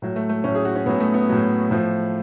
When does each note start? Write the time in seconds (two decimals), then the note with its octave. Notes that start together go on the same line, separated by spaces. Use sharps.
0.02 A2 F#3
0.16 A3
0.29 A3
0.44 A2 F#3 C#4
0.55 G#4
0.65 F#4
0.76 C#4
0.86 A2 F#3 B3
1.00 A3
1.14 B3
1.29 A2 F#3
1.71 A2 F3